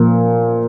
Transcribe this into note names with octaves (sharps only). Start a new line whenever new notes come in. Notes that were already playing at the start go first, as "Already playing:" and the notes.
Already playing: A#2 F3 A#3